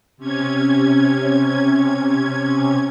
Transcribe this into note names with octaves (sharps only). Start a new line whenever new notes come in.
C3 C#4 G#6